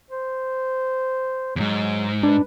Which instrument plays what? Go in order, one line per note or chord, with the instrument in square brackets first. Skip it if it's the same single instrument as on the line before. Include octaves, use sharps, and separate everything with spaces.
[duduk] C5
[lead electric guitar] E2 G#2 [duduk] F#3
[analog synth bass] D4 [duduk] B4